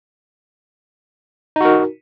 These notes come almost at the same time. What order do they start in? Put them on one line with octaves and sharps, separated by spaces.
D#4 F#4 A#4